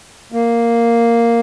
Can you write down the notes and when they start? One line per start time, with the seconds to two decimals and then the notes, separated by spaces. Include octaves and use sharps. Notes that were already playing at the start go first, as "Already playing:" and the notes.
0.32 A#3